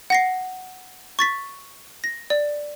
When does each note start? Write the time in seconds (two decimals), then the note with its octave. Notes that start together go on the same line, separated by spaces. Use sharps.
0.10 F#5 A#6 C7
1.19 C#6 A6 B6
2.04 A#6
2.30 D5